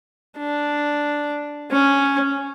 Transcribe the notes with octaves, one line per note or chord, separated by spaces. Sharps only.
D4
C#4